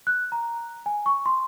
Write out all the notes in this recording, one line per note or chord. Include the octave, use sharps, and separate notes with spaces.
F#6
A#5
G#5
C#6
C6